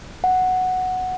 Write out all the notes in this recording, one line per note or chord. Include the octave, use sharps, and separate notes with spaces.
F#5